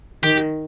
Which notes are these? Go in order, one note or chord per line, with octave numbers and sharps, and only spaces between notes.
D#3 G4